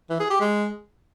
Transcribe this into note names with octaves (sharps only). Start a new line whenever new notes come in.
E3
G#4
G4
G#3